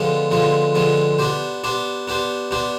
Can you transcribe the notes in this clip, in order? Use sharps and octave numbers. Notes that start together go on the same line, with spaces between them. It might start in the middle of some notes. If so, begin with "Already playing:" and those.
Already playing: D3 F3 G#3 B3 F4
D3 F3 G#3 B3 F4
D3 F3 G#3 B3 F4
B3 D4 G4 C5
B3 D4 G4 C5
B3 D4 G4 C5
B3 D4 G4 C5